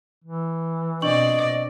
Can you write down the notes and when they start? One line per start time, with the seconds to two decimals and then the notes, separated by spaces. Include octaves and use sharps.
0.24 E3
1.02 B2 C4 D4 D5 D#5 C#6 F#7